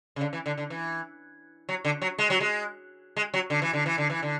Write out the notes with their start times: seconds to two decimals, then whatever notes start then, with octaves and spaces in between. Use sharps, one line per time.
0.16 C#3
0.21 D3
0.33 E3
0.46 D3
0.58 D3
0.70 E3
1.69 F#3
1.85 D3
2.02 F#3
2.18 G#3
2.30 F#3
2.40 G#3
3.16 G#3
3.34 F#3
3.50 D3
3.62 E3
3.73 D3
3.86 E3
3.98 D3
4.10 E3
4.23 D3